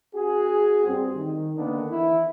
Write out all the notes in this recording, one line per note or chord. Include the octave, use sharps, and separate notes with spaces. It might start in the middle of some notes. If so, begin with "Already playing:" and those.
C#4 F#4 G#4
G2 C4
D#3
D3 D#3 A#3 B3 D4
E2 E4